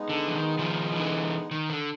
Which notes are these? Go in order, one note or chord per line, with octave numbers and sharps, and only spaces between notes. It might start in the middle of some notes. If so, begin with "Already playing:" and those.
Already playing: G#3 B3 D#4
D3
E3
D#3
D#3 F3
D3 E3
D#3
D3